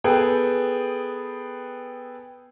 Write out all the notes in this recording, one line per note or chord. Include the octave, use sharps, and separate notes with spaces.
B3 G#4 A4 B4 G5